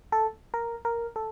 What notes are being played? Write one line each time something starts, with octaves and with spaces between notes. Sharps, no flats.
A4
A#4
A#4
A4